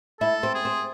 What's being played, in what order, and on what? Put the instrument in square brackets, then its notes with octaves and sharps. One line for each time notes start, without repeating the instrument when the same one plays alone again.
[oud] E4 [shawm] A4
[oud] C4
[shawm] G#4
[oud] C4